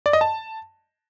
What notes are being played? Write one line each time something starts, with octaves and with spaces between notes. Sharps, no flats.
D5
D#5
A5